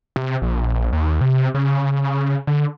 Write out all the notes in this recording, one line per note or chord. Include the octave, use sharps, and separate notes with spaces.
C3
A#1
D#2
C3
C#3
D3